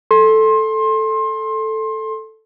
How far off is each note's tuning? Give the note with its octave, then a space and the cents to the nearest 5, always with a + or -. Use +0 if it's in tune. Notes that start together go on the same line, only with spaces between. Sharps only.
A4 +0 C6 +25